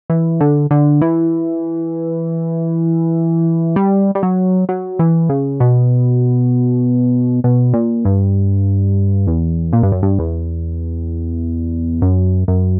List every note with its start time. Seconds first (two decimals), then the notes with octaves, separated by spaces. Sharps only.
0.10 E3
0.40 D3
0.71 D3
1.02 E3
3.76 G3
4.15 G3
4.23 F#3
4.69 F#3
4.99 E3
5.29 C#3
5.60 B2
7.44 B2
7.74 A#2
8.05 G2
9.27 E2
9.73 A#2
9.83 G2
9.92 F#2
10.02 G2
10.19 E2
12.02 F#2
12.48 F#2